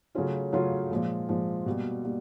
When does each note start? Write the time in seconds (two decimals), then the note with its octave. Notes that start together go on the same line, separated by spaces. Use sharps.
0.15 C#3 F#3 A3 C#4 F4
0.53 C#3 F#3 A3 C#4 F4
0.91 A#2 F3 G#3
1.28 A#2 F3 G#3
1.66 B2 G3 A#3
2.04 G3 A#3